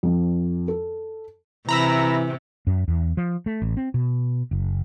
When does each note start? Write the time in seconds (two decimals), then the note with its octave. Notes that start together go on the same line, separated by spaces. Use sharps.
0.03 F2
0.68 A4
1.69 C3 E3 A#5 B5 E6
2.67 F#2
2.88 E2
3.17 F3
3.46 A3
3.62 A1
3.77 C4
3.94 B2
4.51 F#1